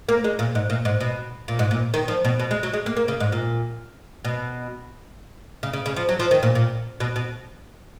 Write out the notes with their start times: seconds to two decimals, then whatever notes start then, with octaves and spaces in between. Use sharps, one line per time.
0.09 A#3
0.24 G#3
0.39 A#2
0.55 G#2
0.70 A#2
0.85 G#2
1.00 B2
1.48 A#2
1.59 G#2
1.71 A#2
1.94 D#3
2.08 F3
2.25 B2
2.39 B2
2.51 G#3
2.63 F#3
2.73 G#3
2.86 A#3
2.97 A#3
3.08 C#3
3.20 G#2
3.32 A#2
4.24 B2
5.63 C#3
5.73 C#3
5.86 C#3
5.96 F3
6.09 F#3
6.19 F3
6.31 D#3
6.43 A#2
6.55 A#2
7.00 B2
7.16 B2